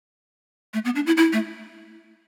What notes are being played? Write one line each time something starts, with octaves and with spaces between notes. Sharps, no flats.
A3
B3
D4
E4
E4
A3